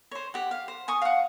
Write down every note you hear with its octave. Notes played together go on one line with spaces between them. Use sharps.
C5 C#5
G4 F#5
F5
C5
G#5 C#6 D#6
F5 F#5